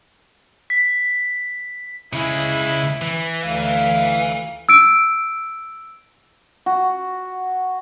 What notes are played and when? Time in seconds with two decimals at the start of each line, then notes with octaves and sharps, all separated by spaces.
0.70 B6
2.13 C#3 G#3 E4
3.02 E3
3.43 D2 F5
4.69 E6 D7
6.66 F#4